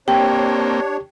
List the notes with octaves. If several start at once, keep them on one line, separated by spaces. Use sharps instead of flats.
A#3 C4 D4 G4 C#5 G5